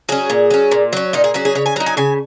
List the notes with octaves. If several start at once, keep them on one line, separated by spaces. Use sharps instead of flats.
F#3 C#4 G#4
A#2
F#3 C#4
A#2
F#3 C#4
A#2 D#4
G#4
F#3 C#4 G#4
G#4
C#3 C#5
G#5
F#3 D#4 A#5
G#5
C#3 G#5